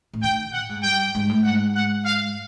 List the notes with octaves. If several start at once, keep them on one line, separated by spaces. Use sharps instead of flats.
A2
D#3 G5
A2 F#5
G#2
G2 G5
G#2
A2
G#2 F#5
F#5
F5